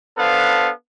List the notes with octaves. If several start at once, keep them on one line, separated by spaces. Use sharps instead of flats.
B3 D4 A4 B4 C5 F5